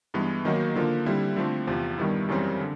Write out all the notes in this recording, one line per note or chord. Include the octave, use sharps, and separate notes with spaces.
G2 E3 G#3 B3
D#3 F#3 A#3 D#4 F#4
D3 F3 A#3
D3 G3 C4 E4
D3 F3 A3 C4
E2 C3 F3
G2 D#3 G3 B3 E4
F#2 C#3 E3 G3 C4
D3